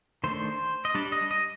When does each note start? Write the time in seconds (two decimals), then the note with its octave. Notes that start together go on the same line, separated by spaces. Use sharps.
0.24 D#3 A3 D4 C5
0.85 D#5
0.95 G3 D4 D5
1.12 D#5
1.31 D#5